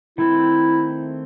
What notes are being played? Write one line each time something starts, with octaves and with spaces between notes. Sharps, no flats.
D#3 A3 C4 E4